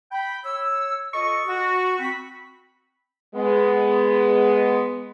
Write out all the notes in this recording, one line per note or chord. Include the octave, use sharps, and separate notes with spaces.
G5 B5
C#5 E6
F4 A4 D#5 C#6
F#4
C4 B5
G#3 B3